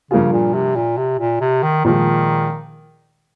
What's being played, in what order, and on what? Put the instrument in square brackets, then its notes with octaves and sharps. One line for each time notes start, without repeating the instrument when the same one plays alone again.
[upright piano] G2 F3 A#3 F4 G#4 [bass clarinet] C#3
[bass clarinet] A#2
C3
A#2
C3
A#2
C3
D#3
[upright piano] A#2 F3 G#3 [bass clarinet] D#3